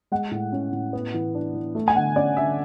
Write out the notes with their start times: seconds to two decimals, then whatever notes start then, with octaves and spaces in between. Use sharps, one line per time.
0.12 G#3 F#5
0.31 A2
0.52 C#4
0.73 A2
0.93 B3
1.14 E3
1.35 D4
1.55 E3
1.75 A3
1.88 G#5
1.96 D3 F#5
2.16 C#4 D5
2.37 D3 E5